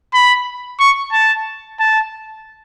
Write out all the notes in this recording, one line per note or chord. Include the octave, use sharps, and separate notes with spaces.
B5
C#6
A5
A5